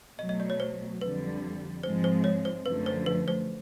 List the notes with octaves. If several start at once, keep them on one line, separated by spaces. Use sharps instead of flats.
B2 F#3 A3 D#5
D#5
D5
C#5
C5
F2 D3 G3 B4
G#2 F3 G#3 C4 C5
C5
C#5
C5
F#2 D3 F3 A3 B4
C5
B4
C5